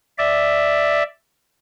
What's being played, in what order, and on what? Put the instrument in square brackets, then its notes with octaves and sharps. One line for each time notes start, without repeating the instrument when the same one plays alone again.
[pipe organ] D5 E5